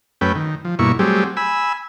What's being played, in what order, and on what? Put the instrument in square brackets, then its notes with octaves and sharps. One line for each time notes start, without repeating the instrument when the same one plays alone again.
[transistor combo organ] F#2 A3 C#4 B4 G5
D#3
F3
G2 B2 A#3 E4 C#6
F#3 G3 A3 C4 G4 G#4
G#5 B5 E6